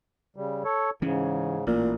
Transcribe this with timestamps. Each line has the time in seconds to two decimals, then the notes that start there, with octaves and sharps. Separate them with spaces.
0.36 C#3 G3
0.65 A4 C#5
1.02 G#2 C#3 E3 C#4
1.67 A1 A#2